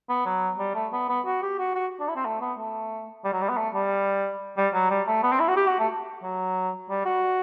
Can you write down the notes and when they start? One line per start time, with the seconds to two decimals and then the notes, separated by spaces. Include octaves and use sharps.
0.09 B3
0.26 F#3
0.59 G3
0.75 A3
0.93 B3
1.09 B3
1.26 F#4
1.42 G4
1.59 F#4
1.75 F#4
2.00 D4
2.09 E4
2.16 C4
2.26 A3
2.42 B3
2.59 A3
3.24 G3
3.33 F#3
3.42 G3
3.49 B3
3.57 A3
3.74 G3
4.57 G3
4.74 F#3
4.90 G3
5.07 A3
5.23 B3
5.32 C4
5.40 E4
5.48 F#4
5.57 G4
5.67 F#4
5.79 A3
6.23 F#3
6.90 G3
7.05 F#4